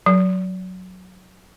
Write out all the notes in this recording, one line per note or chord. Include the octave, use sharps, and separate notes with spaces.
F#3